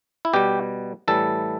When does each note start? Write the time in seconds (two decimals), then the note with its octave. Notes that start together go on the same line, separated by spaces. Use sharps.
0.25 E4
0.34 B2 G3 G4
1.08 A2 E3 G3 A4